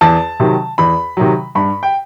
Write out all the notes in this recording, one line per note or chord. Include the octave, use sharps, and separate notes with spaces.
E2 A5
C3 D#3 F#3
E2 B5
C3 D#3 F#3
G2 B5
G5